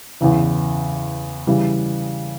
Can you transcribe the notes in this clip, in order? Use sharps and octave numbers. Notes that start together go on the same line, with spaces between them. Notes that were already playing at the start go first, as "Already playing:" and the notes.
E2 C#3 E3
C#3 E3 G3